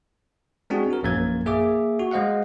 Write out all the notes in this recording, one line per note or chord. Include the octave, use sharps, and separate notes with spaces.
G#3 C4 D4 F#4 G#4
F#4 A#4
A#1 F#2 A#3 A#4 G#6
A#3 G#4 E5 D6
F#4
G#3 C5 D#5 F5 F#5